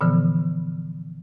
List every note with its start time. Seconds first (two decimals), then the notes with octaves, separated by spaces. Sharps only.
0.01 A#2 D3 E3 F3 B3